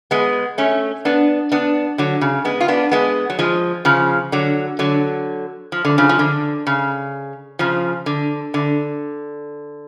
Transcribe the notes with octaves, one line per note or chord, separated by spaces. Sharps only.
G#3 B3
A3 C#4
B3 D4
B3 D4
D3 F#3
C#3
G#3 B3
F4
B3 D4
G#3 B3
F#3
F3 G#3
C#3 F3
D3 F#3
D3 F#3
F3
D3
C#3 F3
F3
D3
C#3
C#3 F3
D3
D3